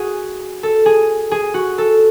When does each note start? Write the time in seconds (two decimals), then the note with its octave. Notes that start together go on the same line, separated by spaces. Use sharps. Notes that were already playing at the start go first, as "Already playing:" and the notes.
Already playing: F#4 G#4
0.63 A4
0.86 G#4
1.31 G#4
1.54 F#4
1.78 A4